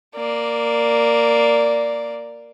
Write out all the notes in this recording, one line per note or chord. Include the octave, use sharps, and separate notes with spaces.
A#3 D5